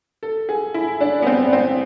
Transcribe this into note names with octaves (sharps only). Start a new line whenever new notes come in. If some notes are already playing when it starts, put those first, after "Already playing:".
A4
G#4
E4
D4
B3
C4
C4